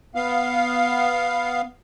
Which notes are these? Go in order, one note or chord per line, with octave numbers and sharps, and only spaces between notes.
B3 F5